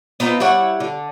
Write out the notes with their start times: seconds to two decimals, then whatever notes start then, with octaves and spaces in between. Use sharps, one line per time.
0.20 B3 C4 D#4 F4
0.40 G3 E4 C#5 F#5
0.80 D3